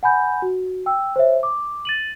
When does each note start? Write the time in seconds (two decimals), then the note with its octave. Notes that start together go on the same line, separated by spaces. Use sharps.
0.03 F#5 G#5 B5 G6
0.42 F#4
0.86 G5 E6
1.16 C5 C#5 E5
1.43 D6
1.85 A6 D#7 F#7